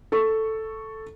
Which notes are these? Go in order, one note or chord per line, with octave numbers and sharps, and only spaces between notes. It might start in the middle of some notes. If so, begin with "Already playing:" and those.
A4 C#6